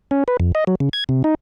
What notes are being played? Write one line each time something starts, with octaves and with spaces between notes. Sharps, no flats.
C#4
B4
F2
D#5
F#3
C#3
G#6
C3
D#4